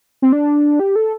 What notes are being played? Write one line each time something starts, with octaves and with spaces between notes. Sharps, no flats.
C4
D4
G4
A4